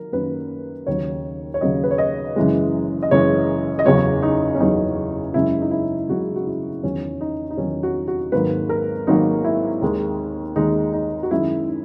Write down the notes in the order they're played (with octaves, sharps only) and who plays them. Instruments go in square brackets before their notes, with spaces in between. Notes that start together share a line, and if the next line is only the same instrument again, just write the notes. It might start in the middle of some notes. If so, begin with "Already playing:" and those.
Already playing: [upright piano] D#3 F#3 A#4
F#2 D#3 F#3 A#3 B4
D#2 C#3 F#3 C#5
C#5
D#2 C#3 F#3 D#5
B4
C#5
D#5
F#1 F#2 E3 G#3
D#5
F#1 F#2 E3 G#3 C#5
D#5
F#1 E2 C#3 F#3 C#5
D#4
C#4
F#1 E2 C#3 F#3 D#4
F#1 F#2 C#3 G#3 E4
D#4
E4
F#1 F#2 C#3 G#3 F#4
F#4
E4
E2 D#3 F#3 C#4
D#4
D#4
E2 D#3 F#3 C#4
F#4
F#4
G#1 G#2 D#3 F#3 A#3 B4
A#4
G#1 G#2 D#3 F#3 A#3 D#4
E4
D#2 D#3 G#3
D#2 D#3 G#3 D#4
D#4
F#4
F#2 D#3 G#3 E4
D#4